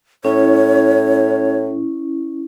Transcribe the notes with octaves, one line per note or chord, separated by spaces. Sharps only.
A2 C#4 E4 C#5